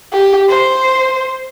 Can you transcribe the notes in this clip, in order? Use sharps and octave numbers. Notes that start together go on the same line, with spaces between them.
G4
C5